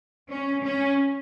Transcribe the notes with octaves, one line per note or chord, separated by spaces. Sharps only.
C#4
C#4